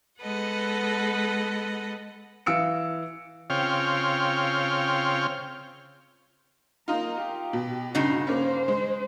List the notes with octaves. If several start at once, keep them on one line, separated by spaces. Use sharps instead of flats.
G#3 B3 A4 B4 D#5 F#5
E3 F5 E6 C#7 D7
C#3 C4 F4 C#5 G5 F6
A#3 D#4 F4 A#5
G4
B2
G2 C#3 D#4 F#4
A#3 C#4 C5
G#3